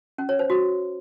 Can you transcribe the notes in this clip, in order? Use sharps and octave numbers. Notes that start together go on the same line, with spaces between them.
C#4
C#5
C5
F#4